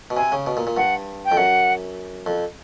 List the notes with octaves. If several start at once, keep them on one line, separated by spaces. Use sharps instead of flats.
B2
C3 G#5
C#3
B2
A#2
A#2
G2 F#5
G5
F2
F#2 F#5
F2